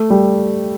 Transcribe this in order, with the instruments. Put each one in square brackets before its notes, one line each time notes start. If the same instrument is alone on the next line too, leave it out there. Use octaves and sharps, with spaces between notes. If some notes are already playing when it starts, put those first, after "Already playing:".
Already playing: [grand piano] A3
G3